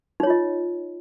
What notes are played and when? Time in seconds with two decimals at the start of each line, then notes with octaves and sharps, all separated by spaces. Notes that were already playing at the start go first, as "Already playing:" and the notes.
0.20 D#4
0.23 C#5
0.27 F4
0.30 D#5